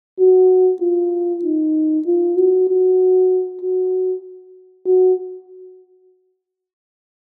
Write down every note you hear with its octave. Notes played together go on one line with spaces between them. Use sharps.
F#4
F4
D#4
F4
F#4
F#4
F#4
F#4